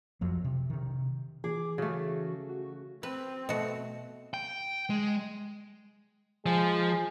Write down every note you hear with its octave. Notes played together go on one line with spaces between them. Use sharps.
F2 F3 F#3
C3
C3 D#3
E3 G#4 D6
C#3 A3 F#4
F#4
C4 B4
B2 A3 F#4
G5
G#3
F3 G#3